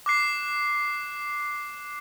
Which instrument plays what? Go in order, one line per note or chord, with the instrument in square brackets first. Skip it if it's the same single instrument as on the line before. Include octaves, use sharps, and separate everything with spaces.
[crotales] D6 F#6 C7